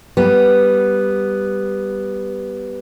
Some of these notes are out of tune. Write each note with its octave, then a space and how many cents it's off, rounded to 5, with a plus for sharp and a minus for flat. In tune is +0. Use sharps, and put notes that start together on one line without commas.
G3 +0 B3 +0